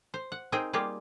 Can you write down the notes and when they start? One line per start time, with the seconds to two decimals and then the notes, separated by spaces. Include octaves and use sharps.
0.14 C5
0.32 F#5
0.52 C4 D#4 G#4 A#4 D#5 G5
0.73 G3 A#3 F4 G4 G#4